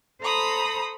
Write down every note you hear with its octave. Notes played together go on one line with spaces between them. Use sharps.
A4 C5 A#5 B5 D#6